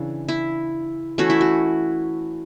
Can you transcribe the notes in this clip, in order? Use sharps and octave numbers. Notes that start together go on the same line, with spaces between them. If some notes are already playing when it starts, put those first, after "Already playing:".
Already playing: C#3 E3 D4
E4
E3 A3 C#4 F#4
E4
F#4